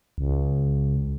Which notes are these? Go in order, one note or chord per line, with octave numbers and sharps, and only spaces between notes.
C#2